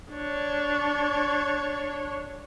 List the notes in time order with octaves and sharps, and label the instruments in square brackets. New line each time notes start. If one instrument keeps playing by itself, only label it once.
[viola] D4 C#5